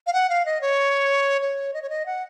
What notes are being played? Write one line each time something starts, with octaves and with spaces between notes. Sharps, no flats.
F5
F#5
F5
D#5
C#5
C#5
D#5
C#5
D#5
F#5